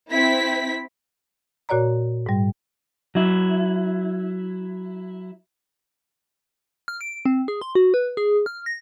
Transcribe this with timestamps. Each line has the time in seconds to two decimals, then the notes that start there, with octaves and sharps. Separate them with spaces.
0.12 C4 E4 B6
1.69 A#2 F#4 C#5 D5 A#5
2.26 G#2 G3
3.15 F#3 E4
6.88 F6
7.01 D7
7.26 C4
7.48 G#4
7.62 C6
7.75 F#4
7.94 B4
8.17 G#4
8.46 F6
8.66 A#6